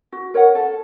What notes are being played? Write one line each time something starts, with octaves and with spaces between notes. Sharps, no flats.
F#4
A#4 C#5 F#5
A4